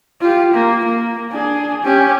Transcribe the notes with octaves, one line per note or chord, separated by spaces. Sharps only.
F4 G4
A#3
A#3
D4 G#4
C#4 G4